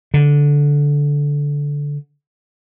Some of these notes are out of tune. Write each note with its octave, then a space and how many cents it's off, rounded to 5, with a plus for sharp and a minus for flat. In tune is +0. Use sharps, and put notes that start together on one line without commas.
D3 -15